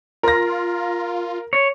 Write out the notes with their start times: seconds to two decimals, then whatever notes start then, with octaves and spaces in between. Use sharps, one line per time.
0.23 F4 A#4 A#6
1.53 C#5